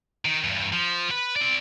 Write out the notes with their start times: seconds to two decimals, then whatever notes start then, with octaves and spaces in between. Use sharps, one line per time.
0.25 D#3
0.44 E2 G2
0.73 F3
1.11 B4
1.36 C4 D5